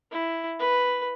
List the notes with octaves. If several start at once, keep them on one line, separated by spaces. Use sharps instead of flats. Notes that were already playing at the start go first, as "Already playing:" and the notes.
E4
B4